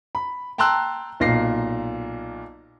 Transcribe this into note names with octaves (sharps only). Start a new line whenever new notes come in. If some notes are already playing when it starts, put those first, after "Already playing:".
B5
G5 A5 A#5 C6 E6 F#6
B1 A#2 A#6 C7